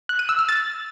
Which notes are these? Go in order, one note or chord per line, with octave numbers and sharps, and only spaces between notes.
F#6
D#7
E6
F6
A6